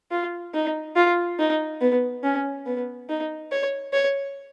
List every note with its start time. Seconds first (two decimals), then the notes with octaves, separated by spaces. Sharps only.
0.11 F4
0.54 D#4
0.96 F4
1.39 D#4
1.81 B3
2.23 C#4
2.66 B3
3.09 D#4
3.52 C#5
3.93 C#5